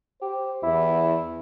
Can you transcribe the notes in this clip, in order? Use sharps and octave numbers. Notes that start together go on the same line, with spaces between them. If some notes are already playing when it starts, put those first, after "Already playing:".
G4 C5
E2 E4